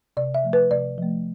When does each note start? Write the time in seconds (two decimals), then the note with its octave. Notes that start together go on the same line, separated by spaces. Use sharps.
0.17 C3 D5
0.34 E5
0.44 F3 A3
0.53 B4
0.71 C3 D5
0.98 F3 A3